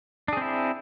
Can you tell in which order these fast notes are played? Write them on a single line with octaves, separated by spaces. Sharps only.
D4 G#4 C4 E4